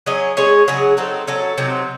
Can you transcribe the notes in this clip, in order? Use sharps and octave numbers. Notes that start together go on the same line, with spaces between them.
F#3 C#4 G#4 D#5
G#3 C#4 G#4 C#5
C#3 F#3 C#4 G#4
F#3 C4 D#4 A4
F#3 C#4 F#4 A4
C3 F#3 C4 D#4